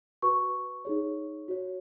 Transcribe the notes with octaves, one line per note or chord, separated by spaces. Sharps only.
F#4 B4 C#6
D#4 G#4 C#5
F#4 C#5